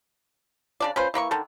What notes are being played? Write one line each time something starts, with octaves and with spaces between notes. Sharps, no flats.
C#3 D4 D5
C#4 F4 B4 C5
E3 A#3 B5 C#6
D3 D#3 A4